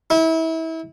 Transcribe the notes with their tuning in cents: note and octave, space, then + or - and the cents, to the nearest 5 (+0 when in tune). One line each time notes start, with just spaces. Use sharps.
E4 -30